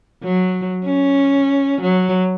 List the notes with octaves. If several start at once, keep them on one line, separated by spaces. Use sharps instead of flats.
F#3
C#4
F#3